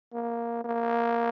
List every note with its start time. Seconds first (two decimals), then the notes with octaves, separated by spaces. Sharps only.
0.13 A#3
0.64 A#3